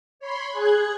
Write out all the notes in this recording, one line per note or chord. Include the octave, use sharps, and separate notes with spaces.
C#5 B5 C6
G#4 F#6 G#6